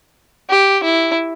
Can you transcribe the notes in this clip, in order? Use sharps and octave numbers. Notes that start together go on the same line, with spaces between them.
G4
E4